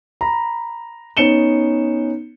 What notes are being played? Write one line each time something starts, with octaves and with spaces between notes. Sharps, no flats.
A#5 B5
B3 C#4 D#4 C#7 E7 G7